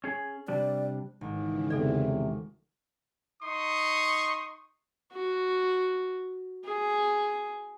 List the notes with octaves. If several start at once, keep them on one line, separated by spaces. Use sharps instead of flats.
C#4 G#4
C3 G3 D4 D5
G#1 C#3 E3
E2 C3 A4 D5
D#4 C6 C#6 D#6
F#4
G#4